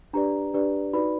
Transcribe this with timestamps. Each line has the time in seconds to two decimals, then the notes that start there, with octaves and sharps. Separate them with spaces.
0.13 D4 G4 B4 D5 A#5
0.54 D4 G4 B4 D5
0.93 D#4 F#4 B4 D5 B5